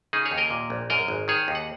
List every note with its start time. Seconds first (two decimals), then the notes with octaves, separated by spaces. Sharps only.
0.13 C#3 D#4 G#4
0.25 G#4 C#5
0.31 D#2
0.38 A#4 D#5
0.50 A#2
0.70 A#1
0.90 F#2 A#4 D#5
1.08 G#1
1.28 D#3 G#4 C#5
1.48 D#2
1.55 F#5